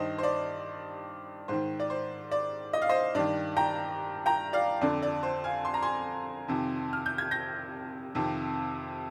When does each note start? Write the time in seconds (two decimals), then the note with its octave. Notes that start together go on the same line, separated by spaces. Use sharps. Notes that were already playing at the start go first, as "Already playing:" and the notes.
Already playing: G2 D#3 C5 D#5
0.18 C5
0.23 D5
1.48 G#2 D#3 C5
1.80 D5
1.90 C5
2.31 D5
2.73 D#5
2.82 F5
2.89 C5 D#5
3.15 G2 D#3 D5
3.57 G5 A#5
4.26 G5 A#5
4.53 D5 F5
4.81 F2 D3 D5
5.02 D5
5.23 C5
5.44 F5 G#5
5.65 C6
5.74 A#5
5.82 G#5 C6
6.48 F2 C3 D#3
6.93 F6
7.06 G6
7.18 G#6
7.31 G6 A#6
8.15 F2 C3 D#3